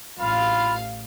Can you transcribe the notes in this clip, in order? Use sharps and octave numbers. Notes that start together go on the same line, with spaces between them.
A1 F4 F5 B5